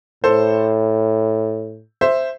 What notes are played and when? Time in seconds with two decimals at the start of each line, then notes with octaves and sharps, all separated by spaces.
0.24 A2 A4 C5
2.01 C5 E5